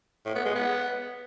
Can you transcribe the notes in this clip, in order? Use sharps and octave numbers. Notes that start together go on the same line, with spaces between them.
A2
B3
G#3
B3